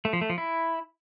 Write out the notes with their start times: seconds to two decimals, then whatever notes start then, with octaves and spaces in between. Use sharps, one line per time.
0.05 A3
0.13 F3
0.21 A3
0.30 F3
0.38 E4